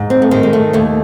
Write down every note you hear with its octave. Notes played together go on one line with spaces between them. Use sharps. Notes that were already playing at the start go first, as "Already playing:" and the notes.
Already playing: G#2
C4
A3
D#3 G#3
G#3
A3
D#2 A3